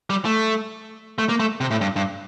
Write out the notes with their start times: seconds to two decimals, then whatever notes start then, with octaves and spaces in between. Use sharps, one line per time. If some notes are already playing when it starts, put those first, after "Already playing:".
0.10 G3
0.25 A3
1.18 A3
1.29 A#3
1.40 A3
1.61 C3
1.71 A2
1.81 G2
1.96 G2